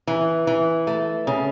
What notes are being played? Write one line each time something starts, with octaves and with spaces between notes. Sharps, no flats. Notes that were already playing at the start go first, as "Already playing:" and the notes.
E3
E3
A3
C#3